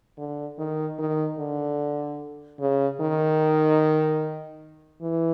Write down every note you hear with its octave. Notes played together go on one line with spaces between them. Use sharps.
D3
D#3
D#3
D3
C#3
D#3
E3